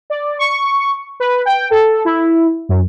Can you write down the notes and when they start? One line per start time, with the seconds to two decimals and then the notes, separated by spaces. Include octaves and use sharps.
0.10 D5
0.39 C#6
1.20 B4
1.45 G5
1.71 A4
2.05 E4
2.69 F#2